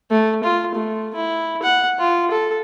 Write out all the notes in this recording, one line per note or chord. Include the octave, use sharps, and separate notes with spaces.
A3
F4
A3
E4
F#5
F4
A4